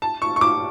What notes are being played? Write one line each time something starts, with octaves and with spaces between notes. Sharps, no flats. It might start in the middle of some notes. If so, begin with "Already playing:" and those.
A5
C#6
C#6
D6